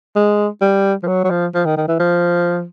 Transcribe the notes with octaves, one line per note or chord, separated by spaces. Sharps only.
G#3
G3
F3
F#3
F#3
F3
F3
D#3
D#3
E3
F3